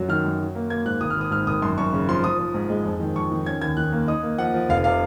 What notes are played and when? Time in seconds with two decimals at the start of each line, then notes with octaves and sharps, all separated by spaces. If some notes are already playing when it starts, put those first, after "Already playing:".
Already playing: F#2 F#3
0.09 D#3 F6
0.25 F#2
0.40 F#3
0.55 A#3
0.70 A#3 G#6
0.85 G#2 F#6
1.01 G#1 D#6
1.10 F6
1.16 G#1 D#6
1.31 G#2 F6
1.47 G#1 D#6
1.62 F#2 C6
1.78 F#2 C#6
1.93 C#3
2.08 F3 C6
2.24 F3 D#6
2.39 F3
2.54 G#2
2.70 G#3
2.85 F2
3.00 D#3
3.15 F2 C#6
3.32 D#3
3.46 C#4 G#6
3.62 D#2 G#6
3.77 D#3 F#6
3.92 A#3
4.08 D#4 D#6
4.23 A#3
4.38 F3 F#5
4.54 F3
4.69 F1 F5
4.84 C3 F5